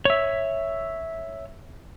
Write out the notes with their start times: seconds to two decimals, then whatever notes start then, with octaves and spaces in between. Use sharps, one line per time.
0.05 C#5 E5